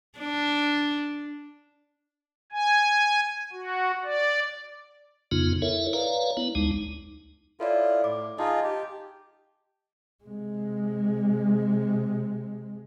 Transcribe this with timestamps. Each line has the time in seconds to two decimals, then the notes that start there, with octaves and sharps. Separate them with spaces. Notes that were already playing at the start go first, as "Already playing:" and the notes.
0.19 D4
2.52 G#5
3.52 F#4
4.04 D5
5.32 F2 C#3 B3 D#4 F4
5.62 E4 A4 A#4 C#5 E5
5.93 B4 C#5 D5 F5 A#5
6.37 B3 E4
6.55 D2 G#3 D#4
7.60 E4 F4 A4 C#5 D5
8.04 A2 D6
8.38 D#4 F4 G#4 D#5 A5
8.64 G4
10.24 C3 G#3